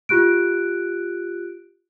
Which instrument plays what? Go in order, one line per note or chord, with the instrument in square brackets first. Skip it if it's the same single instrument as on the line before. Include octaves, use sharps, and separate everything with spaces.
[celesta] F4 G4 F#6 D7